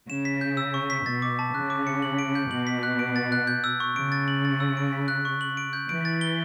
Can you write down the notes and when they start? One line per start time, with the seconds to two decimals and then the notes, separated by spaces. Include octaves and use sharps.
0.09 C#3 E7
0.25 B6
0.41 G6
0.57 E6
0.74 C#6
0.90 B6
1.06 B2 A6
1.22 D6
1.39 A5
1.54 C#3 F#6
1.70 D6
1.87 C#7
2.02 F#7
2.19 D7
2.35 G6
2.51 B2 F#7
2.67 B6
2.83 F#6
2.99 D7
3.16 A6
3.32 F#6
3.47 G6
3.64 E6
3.80 C#6
3.96 C#3 D7
4.12 A6
4.28 F#7
4.45 A6
4.60 E6
4.77 D7
4.92 B6
5.08 F#6
5.25 C#6
5.41 F#7
5.57 D7
5.73 G6
5.89 E3 D7
6.05 A6
6.21 G7